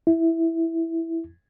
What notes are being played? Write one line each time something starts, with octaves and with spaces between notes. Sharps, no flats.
E4